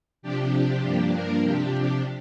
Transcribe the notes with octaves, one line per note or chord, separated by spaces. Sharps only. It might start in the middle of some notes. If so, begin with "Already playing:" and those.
C3 F3 D4 G4
G2 F3 A#3 D4
A#4
C3 F3 D4 G4